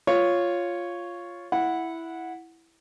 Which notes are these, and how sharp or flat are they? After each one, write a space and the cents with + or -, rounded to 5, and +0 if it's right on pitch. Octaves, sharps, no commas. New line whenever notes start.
F4 +0 C#5 +0
E4 +0 F#5 -10